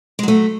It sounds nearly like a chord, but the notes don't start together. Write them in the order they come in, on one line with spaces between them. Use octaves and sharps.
G#3 F#3 A3